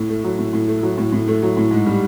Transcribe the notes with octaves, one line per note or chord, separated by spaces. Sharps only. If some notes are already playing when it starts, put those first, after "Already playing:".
Already playing: A2
A3
F#3
A2
A2
A3
F#3
A2
A2
A3
F#3
A2
G#2
G3